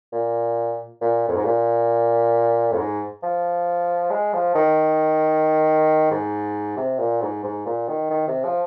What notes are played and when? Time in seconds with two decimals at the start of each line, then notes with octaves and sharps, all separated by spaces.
0.12 A#2
1.01 A#2
1.28 F2
1.36 G#2
1.45 A#2
2.72 F2
2.78 G#2
3.23 F3
4.10 G#3
4.33 F3
4.55 D#3
6.11 G#2
6.77 C3
6.99 A#2
7.22 G#2
7.43 G#2
7.66 A#2
7.88 D#3
8.10 D#3
8.27 C3
8.44 F3